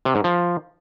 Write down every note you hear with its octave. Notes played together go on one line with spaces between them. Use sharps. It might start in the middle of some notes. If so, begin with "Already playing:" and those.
C3
G#2
F3